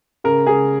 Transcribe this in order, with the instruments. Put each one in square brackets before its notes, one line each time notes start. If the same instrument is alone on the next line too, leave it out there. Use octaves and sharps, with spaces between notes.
[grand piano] C#3 A#4
C#3 G#4